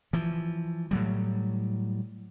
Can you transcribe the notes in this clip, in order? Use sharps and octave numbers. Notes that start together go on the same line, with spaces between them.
E3 F3
A2 F#3 G3